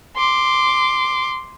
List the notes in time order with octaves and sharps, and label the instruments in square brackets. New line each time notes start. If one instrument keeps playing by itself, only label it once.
[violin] C6 D6